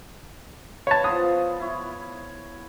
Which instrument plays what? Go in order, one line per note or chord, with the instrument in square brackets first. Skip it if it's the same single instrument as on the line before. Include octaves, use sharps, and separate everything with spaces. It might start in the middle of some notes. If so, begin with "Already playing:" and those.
[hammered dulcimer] B4 [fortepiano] C#5 A5
[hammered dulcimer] F3 B3 F4 [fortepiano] D#6
[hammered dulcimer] E4 C#5